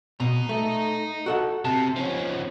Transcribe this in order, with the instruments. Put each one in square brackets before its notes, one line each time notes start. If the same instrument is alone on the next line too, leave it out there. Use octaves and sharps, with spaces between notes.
[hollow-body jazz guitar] B2 [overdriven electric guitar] D#5 A#5
[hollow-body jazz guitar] A3
F#4 A4 F#5
[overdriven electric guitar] C3 [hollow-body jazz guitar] A5
[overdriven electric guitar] F3 C#4